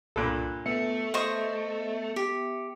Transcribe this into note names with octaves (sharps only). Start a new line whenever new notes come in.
C2 G2 A#2 A4 B5 F#6
A3 B3 E5 C#7
C5 D#5 C#6
G4